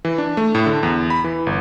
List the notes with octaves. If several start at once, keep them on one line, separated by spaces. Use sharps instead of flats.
E3
D4
A3
A2
D3
E2
B5
E3
G1